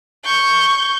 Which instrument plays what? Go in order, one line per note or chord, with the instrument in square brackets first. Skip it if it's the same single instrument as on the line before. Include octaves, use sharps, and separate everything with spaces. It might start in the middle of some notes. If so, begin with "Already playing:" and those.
[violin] C#6 G6